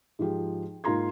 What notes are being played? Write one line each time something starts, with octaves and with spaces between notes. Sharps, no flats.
G#2 F3 G4 G#4
G#2 A#3 F4 A#5 C6 G#6